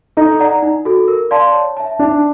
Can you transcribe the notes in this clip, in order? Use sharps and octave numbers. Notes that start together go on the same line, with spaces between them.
D#4 A4
D5 F#5 A#5
D#4
F#4 A4
A#4
D5 F5 A5 C6
C#5
E5 A5
D4 D#4